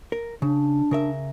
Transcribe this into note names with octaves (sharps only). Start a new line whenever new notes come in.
A#4
C#3 D4
C#3 A#4 E5